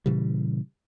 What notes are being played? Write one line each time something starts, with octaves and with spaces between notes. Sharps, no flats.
A#2 C#3 E3 G3